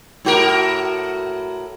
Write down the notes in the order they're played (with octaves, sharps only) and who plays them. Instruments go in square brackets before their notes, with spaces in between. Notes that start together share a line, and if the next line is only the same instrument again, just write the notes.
[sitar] A2 F#4 A#4